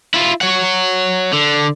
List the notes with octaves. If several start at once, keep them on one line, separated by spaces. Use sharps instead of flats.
E4 F4
C#5 F#5
D3